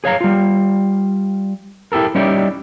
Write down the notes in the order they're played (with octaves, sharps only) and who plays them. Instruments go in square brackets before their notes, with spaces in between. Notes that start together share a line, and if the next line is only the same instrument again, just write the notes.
[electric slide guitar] G#4 C#5 F5 A#5
G3 F4
E4 G4 A4 A#4
G3 C#4 D#4 E4 G4 D5